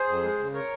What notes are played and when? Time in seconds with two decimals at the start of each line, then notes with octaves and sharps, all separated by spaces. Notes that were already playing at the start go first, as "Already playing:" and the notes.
Already playing: G#4 C5
0.08 F2
0.24 G#3
0.39 C#3
0.54 A#4 C#5